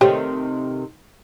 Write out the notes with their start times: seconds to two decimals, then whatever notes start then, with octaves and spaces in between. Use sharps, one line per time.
0.01 C3 D#3 A3 G4 C5 C#5